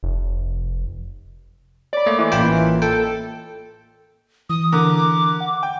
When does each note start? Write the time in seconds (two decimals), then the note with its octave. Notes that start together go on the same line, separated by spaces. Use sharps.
0.03 F1
1.93 C#5 D5 B5
2.07 A3 A#3
2.19 E3 C5 D#5
2.32 A1 A#3 F4 B4 G5
2.82 A4 G5
4.50 E3 D#6
4.72 D3 A#4 D6
4.97 D6
5.40 F#5
5.63 G5